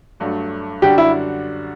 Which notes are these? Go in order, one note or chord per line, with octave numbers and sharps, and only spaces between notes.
G2 F#3 A3 D4 F#4
F#2 D3 G3 D4 F#4 G4
E4